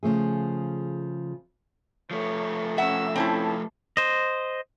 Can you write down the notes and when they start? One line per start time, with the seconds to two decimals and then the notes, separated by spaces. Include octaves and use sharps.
0.03 C#3 F3 A3 G#4
2.11 F3 A3 C#5
2.78 C#4 E5 F#5 E6
3.16 C4 C#4 E4 A4 A5
3.97 C5 D#5